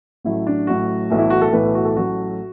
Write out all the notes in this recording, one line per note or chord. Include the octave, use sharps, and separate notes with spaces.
A1 A2 F#3 A3 E4
D4
A1 A2 F#3 A3 F#4
B1 A2 E3 A3
E4
F#4
A4
B1 A2 E3 A3 B4
F#4
A4
A1 A2 F#3 A3 F#4